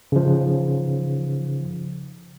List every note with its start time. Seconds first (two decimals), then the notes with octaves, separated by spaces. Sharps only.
0.12 C#3 F3